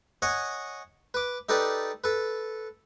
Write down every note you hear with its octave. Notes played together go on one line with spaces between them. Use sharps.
C#5 D#5 F#5 G#5
B4 D6
D#4 G4 A4 B4 D5
A4 B4